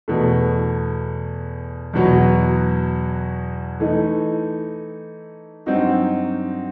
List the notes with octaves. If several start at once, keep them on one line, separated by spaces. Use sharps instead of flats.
E2 B2 A3
E2 B2 F#3
E3 A3 D#4
G2 F#3 C4 D#4 F#4